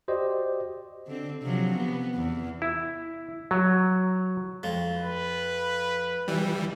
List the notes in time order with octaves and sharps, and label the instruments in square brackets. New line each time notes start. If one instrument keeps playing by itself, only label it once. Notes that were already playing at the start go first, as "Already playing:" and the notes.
[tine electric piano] F#4 G4 C5 D5 D#5
[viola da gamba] D3 C4
C3 F3 F#3
B3
E2
[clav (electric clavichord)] E4
F#3
[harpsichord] F2 F3
[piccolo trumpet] B4
[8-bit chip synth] E3 G3